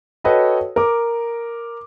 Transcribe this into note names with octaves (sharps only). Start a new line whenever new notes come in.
F#4 A4 B4 C#5 D#5 G5
A#4 D6